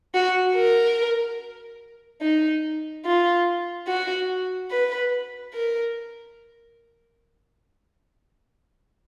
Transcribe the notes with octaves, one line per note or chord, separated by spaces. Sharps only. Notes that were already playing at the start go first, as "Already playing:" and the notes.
F#4
A#4
D#4
F4
F#4
B4
A#4